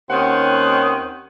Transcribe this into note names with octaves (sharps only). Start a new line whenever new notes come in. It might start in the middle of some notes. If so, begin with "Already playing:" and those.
D#2 D#3 C4 C#4 F#5